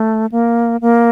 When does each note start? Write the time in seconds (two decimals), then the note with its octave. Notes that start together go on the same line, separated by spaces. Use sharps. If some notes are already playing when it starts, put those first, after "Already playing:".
Already playing: A3
0.32 A#3
0.81 A#3